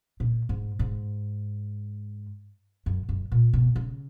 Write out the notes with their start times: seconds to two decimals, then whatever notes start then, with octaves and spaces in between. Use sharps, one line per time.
0.20 A#2
0.49 G#2
0.79 G#2
2.86 F#2
3.09 F#2
3.32 A#2
3.53 B2
3.76 C#3